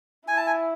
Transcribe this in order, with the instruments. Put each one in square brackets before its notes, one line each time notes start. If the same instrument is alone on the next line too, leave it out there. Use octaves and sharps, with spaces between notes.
[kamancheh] E4 [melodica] G#5
[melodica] A5
G#5